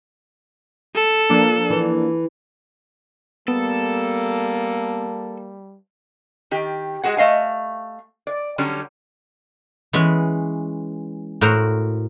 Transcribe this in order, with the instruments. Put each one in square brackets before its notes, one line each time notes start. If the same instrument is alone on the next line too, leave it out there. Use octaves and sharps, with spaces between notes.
[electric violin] A4
[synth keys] F3 A#3 D4
[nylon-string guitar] E3
[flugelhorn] G3 [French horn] A#3 [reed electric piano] B3 [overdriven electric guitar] A4
[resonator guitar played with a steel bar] D#3 G4
G#3 A3 F#4 G#4 F#5
A3 D#5 F5 G#5
D5
D3 F#3 G3 C#4
[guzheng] E3 G#3 B3 C#4
A2 F#4 A#4 C5 A#5